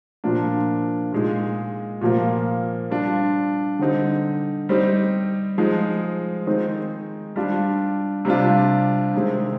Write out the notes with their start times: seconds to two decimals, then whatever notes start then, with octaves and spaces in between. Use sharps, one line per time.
0.24 A#2 F3 A#3 D4
1.13 A#2 G#3 D#4
2.01 A#2 F3 A#3
2.90 G3 D4 F4
3.79 D3 G3 C4 D#4
4.69 G3 C4 D#4
5.58 F3 G#3 D#4
6.47 D#3 G#3 C4 D#4
7.36 G3 D4 F4
8.25 C3 G3 D4 F4
9.14 C3 D#3 G#3 C4